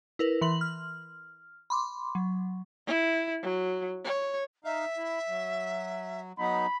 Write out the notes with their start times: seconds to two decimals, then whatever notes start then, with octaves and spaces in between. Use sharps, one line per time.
0.19 E4 A#4 B4
0.41 E3 C6 F#7
0.61 F6
1.70 B5 C6 D6
2.15 F#3
2.87 E4
3.43 F#3
4.05 C#5
4.65 D#4 E5 F5
4.97 E4
5.28 F#3
6.39 F#3 B3 D#4 B5